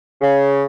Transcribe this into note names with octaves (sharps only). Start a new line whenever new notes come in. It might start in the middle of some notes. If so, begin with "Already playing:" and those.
C#3